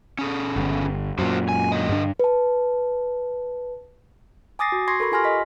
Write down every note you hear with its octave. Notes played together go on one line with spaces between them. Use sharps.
C#4 G#4 A4
G1
F#2 A#2 F#4 C5
G#5
D3 D#5
G2 D4
B4 A5
G#5 D6 D#6 A6 A#6 C7
F#4
C6 C#6 G#6 A#6 C7
A4 A#4 B5 C#6
F4 G4 G#5 C6 F6 A#6
D#5 B6